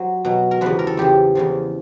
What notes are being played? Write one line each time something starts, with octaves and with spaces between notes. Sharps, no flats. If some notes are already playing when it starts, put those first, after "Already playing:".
Already playing: F#3 C5
B2 F#3
A#4
E2 C#3 F3 B4
A#4
A4
E2 C#3 F3 G4
E2 C#3 F3